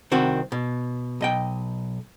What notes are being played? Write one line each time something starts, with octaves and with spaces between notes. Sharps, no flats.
C2 D#3 C4 F#4
B2
B1 D#5 G5